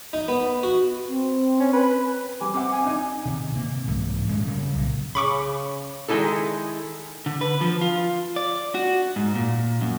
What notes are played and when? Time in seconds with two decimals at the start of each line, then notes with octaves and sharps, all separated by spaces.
0.13 D#4
0.28 B3
0.63 F#4
1.08 C4
1.60 C#4
1.73 B4
2.41 G3 G#5 D6
2.54 C4 E5 F#5 D6
2.72 G#5
2.84 D4 D#4
3.25 C3 D#3
3.52 C3 A#3
3.87 C2 G#2 E3
4.28 D#1 G#3 C#4
4.46 C#3 F#3 G3
4.73 C2 A#2
5.15 C#3 B5 C#6 D6
6.08 D#3 G#3 C4 D#4 E4 A4
7.26 D3
7.41 B4
7.61 F3
7.81 F4
8.36 D5
8.75 F#4
9.16 G#2
9.35 A#2
9.81 F#2